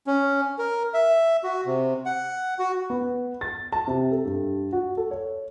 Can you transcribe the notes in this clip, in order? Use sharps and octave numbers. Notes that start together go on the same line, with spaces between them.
C#4
A#4
E5
F#4
C3
F#5
F#4
B3
A6
A5
C3
A4
G2
F#4
A4
C#5